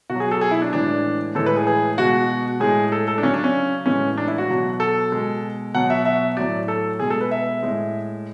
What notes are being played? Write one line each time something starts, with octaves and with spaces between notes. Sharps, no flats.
B2 F#4
F#3
G#4
A4
G#4
E4
D4
A2 E3 G#3 D4
A2 E3 G#3 A4
B4
G#4
G#4
B2 G#3 F#4
A2 G#3 G#4
A4
A4
D4
C#3 F#3 C#4
D4
C#4
A2 E3 G#3 C#4
D4
E4
F#4
B2 F#3
A4
B2 G#3
B2 F#3 F#5
E5
E5
A2 F#3 D5
A4
B2 G#3 G#4
A4
B4
E5
A2 G#3